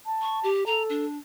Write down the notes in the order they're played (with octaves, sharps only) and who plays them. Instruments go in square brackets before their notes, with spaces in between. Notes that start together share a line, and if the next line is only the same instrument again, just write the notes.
[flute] A5
[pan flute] C#6
G4
[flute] A4 [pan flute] A#5
[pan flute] D4